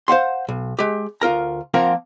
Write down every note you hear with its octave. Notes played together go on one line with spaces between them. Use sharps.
C5 F5 F#5 C6
B1
G#3 G4
D2 F4 A#4 A#5
F3 A#3 C4 F4 A#4 F#5